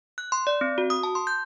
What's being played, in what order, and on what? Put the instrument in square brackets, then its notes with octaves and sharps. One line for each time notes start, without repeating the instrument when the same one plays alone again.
[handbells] F#6
C6
D5
C4
F#4
D#6
A5
C6
G6